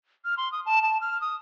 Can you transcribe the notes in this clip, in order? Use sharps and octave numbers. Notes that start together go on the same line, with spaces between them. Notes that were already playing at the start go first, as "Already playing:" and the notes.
F6
C6
D#6
A5
A5
F6
D#6